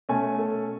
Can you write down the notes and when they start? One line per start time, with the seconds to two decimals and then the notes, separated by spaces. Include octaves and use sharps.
0.09 B2 A3 C#4 G#5
0.39 A4